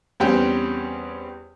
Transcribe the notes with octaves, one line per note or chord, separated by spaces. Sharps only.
E2 G3 C4 C#4 G4 G5